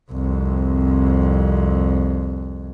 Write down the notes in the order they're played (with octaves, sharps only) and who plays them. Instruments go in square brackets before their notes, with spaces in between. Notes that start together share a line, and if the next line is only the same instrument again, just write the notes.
[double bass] C2 F2